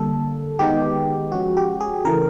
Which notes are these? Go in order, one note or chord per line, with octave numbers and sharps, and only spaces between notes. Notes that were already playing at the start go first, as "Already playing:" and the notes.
Already playing: D3 G3 A#3 A4
D#3 G#3 B3 D#4 G4
F3 G#3 C#4 F#4
G4
G#4
C#3 E3 A3 A#4